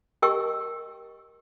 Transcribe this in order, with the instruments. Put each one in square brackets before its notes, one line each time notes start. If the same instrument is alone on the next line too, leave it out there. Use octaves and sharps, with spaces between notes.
[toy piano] G4 A#4 D#5 G5 C#6 E6